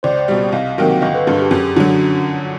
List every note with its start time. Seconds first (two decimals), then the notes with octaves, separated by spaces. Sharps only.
0.03 C#2 C5 D5
0.28 B2 G3
0.52 C2 D#5 F5
0.78 C3 D#3 F#3 A#3 G5
0.90 F#5
1.02 G1 D#5 F5
1.14 A4 B4
1.26 G2 D3 G#4 A#4
1.39 G4 A4
1.51 F#2 G#4
1.76 D3 F#3